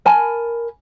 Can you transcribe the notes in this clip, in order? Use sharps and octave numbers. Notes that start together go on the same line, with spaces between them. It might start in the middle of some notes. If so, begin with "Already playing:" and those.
A#4 G#5 A5 B5